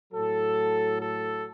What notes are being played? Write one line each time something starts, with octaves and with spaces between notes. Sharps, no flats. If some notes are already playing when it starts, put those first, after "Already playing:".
A2 F#3 A4
A4